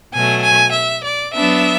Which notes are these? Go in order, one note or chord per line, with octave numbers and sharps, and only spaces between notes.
B2 F#3 A3 G#5
G#5
E5
D5
F#3 B3 D4 E5